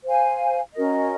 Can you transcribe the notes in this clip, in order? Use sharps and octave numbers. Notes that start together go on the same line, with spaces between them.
C5 F5 G#5
C#4 F#4 A#4 D#5